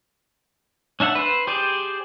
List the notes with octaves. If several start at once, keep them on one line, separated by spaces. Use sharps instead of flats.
C#4 D4 E5 F#5
B4 C5
G4 G#4 C5 D5